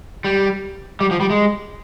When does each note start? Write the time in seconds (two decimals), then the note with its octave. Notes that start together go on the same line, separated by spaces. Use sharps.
0.24 G3
1.01 G3
1.11 F3
1.21 G3
1.30 G#3